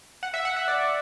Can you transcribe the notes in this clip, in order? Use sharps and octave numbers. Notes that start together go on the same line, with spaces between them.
F#5
E5
F#5
E5
D5